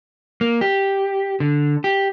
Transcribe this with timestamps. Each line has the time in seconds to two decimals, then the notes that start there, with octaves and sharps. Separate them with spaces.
0.41 A#3
0.61 G4
1.40 D3
1.84 G4